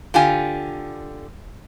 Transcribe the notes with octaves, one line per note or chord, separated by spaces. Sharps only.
D3 F4 G4 G#5